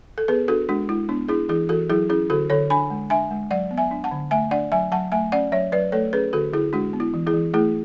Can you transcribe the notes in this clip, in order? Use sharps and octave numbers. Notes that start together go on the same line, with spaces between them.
A4
B3 G#4 B4
D4 F#4 A4
G#3 D4 F#4
G#3 E4
B3 D4
D4 E4 G#4
E3 E4 G#4
E3 F#4 A4
F#3 E4 G#4
C#4 E4 G#4
D3 F#4 A4
D3 A4 C#5
D4 G#5 B5
G#3
D4 E5 G#5
G#3
F#3 D5 F#5
B3
E5 G#5
D4
F#5 A5
D3
A3 E5 G#5
D4 D5 F#5
F#3 E5 G#5
F#3 F#5 A5
A3 E5 G#5
C#4 D5 F#5
F#3 C#5 E5
F#3 B4 D5
A3 A4 C#5
C#4 G#4 B4
D3 F#4 A4
D3 E4 G#4
G#3 D4 F#4
B3
E4
E3
E4 G#4
E3
A3 E4 G#4